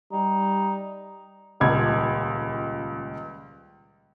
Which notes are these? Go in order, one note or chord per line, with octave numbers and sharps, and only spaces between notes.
G3 D#4
D#1 C#2 G#6